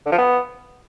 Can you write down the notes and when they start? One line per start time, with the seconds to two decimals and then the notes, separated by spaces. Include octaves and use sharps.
0.06 D3
0.12 F3
0.18 B3